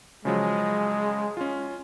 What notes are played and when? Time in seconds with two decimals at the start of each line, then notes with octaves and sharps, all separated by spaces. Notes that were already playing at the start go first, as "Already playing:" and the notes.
0.25 C#3 F3 F#3 G#3
1.37 C#4 F4